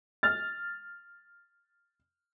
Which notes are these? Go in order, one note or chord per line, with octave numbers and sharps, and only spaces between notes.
F6 A6